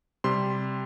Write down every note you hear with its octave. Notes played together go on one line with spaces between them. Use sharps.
C3 G3 C6